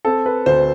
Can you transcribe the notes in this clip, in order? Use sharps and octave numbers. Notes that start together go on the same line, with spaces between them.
C4 A4
B4
D2 C5